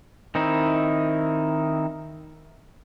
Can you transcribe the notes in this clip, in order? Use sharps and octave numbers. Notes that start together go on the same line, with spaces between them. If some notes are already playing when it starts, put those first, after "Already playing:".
D#3 C4 D#4 E4